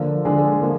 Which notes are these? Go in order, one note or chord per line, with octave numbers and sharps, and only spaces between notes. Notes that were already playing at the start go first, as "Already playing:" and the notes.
Already playing: D3 F3 A#3 D4
D3 G#3 D4 G#4
F3 A#3